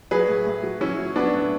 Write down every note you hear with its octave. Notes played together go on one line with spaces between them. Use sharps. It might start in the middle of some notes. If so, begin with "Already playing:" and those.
F#3 G#4 B4
A2
A2
F#3
F#3 C#4 E4
F#3
F#3 B3 D4
A2